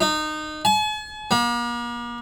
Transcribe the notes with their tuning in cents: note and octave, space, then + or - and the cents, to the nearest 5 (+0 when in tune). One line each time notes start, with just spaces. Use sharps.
D#4 -20
G#5 +45
A#3 +40